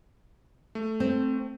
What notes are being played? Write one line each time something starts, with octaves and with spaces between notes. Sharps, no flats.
A3
C4